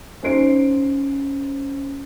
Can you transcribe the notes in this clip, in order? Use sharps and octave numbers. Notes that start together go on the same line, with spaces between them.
C#4 D#4 C5 C7 D7